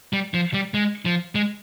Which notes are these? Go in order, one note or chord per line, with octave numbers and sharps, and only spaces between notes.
G3
F3
G3
G#3
F3
G#3